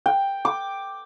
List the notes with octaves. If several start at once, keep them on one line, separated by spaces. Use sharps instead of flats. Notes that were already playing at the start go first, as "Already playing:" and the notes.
G5
D6